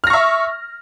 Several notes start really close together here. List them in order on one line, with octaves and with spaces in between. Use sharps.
F6 A#6 C#6 E5